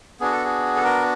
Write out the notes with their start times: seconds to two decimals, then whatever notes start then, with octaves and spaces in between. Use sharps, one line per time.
0.20 B3 D4 F#4 G#4
0.32 A4
0.45 G#4
0.76 A4
0.84 A#4